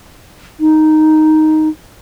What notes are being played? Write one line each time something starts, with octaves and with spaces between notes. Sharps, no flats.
D#4